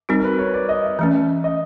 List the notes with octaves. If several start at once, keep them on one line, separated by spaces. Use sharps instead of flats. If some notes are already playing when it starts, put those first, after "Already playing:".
G3 C4 D#4 F#4 A#4
A#4
B4
C#5
D5
D#5
E5
E3 A3 C#4
D#5